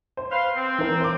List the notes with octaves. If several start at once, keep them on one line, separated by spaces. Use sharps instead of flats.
C5
B4 F5 C6
C4
E3 A#4
C5 D6